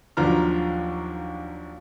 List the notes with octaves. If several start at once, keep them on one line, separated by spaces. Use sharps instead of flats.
D#2 F3 F#3 D4 A#5 F6